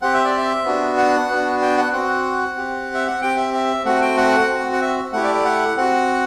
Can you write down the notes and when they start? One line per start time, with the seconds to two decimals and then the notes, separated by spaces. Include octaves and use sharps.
0.02 C4 G4 F#5
0.14 E5
0.25 D5
0.37 E5
0.65 B3 D4 F#4
0.97 F#5
1.30 B3 D4 F#4
1.62 G5
1.77 F#5
1.93 C4 F#4 F#5
2.57 C4 G4
2.94 E5
3.07 F#5
3.22 C4 G4 G5
3.37 E5
3.54 E5
3.85 A3 C4 F#4 F#5
4.02 G5
4.17 F#5
4.49 C4 F#4
4.73 F#5
4.82 E5
5.13 A3 E4 G4 F#5
5.24 D5
5.35 D5
5.45 F#5
5.77 C4 F#4 F#5